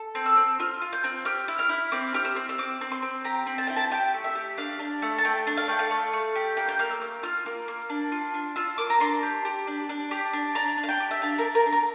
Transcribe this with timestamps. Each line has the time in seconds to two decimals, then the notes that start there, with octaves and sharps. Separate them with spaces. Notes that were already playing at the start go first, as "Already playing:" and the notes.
Already playing: A4
0.15 C4
0.26 E6
0.37 C4
0.60 F4 F6
0.82 F4
0.93 G6
1.04 C4
1.25 G4 F6
1.48 E4
1.59 F6
1.69 E4
1.92 C4 D6
2.14 G4 F6
2.25 E6
2.36 C4
2.49 E6
2.58 C4 D6
2.81 C4
2.92 C6
3.02 C4
3.24 G4 A#5
3.46 C4
3.58 A5
3.67 E4 G5
3.76 A5
3.91 G4 G5
4.14 A3
4.24 E5
4.35 G4
4.57 D4 F5
4.79 D4
5.02 A3
5.18 A5
5.25 A3 G5
5.47 D4
5.57 F5
5.68 A3 G5
5.79 F5
5.90 A3
6.13 A3
6.36 G4
6.57 A#3 G5
6.69 G6
6.79 A#3 F6
6.90 E6
7.01 A#3
7.23 F4 F6
7.46 A#3
7.68 A#3
7.90 D4
8.12 F4
8.34 D4
8.56 F4 E6
8.78 A#3 D6
8.90 A#5
9.00 D4 C6
9.23 G4
9.45 G4
9.67 D4
9.89 D4
10.11 G4
10.33 D4
10.55 D4 A#5
10.77 D4
10.83 F5
10.89 G5
11.00 G4
11.11 E5
11.22 D4 F5
11.38 A#4
11.44 D4
11.55 A#4
11.66 D4
11.72 A#4